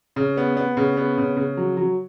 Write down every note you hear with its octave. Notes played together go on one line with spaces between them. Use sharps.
C#3
B3
B3
C#3
B3
C#3
C#3
F#3
F#3